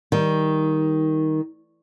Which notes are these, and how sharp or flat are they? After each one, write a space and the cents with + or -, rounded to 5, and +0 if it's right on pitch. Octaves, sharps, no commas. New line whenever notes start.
D#3 +10 G3 +0